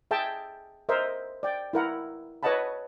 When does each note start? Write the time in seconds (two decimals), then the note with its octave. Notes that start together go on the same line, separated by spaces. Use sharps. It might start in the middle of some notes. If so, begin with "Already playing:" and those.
0.11 G#4 E5 G5 A5
0.89 A#4 C5 D#5 E5
1.43 D5 G5
1.73 E4 A#4 F#5
2.43 B4 C#5 D#5 F#5 A5 B5